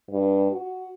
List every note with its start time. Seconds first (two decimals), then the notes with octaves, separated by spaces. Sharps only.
0.10 G2
0.52 F#4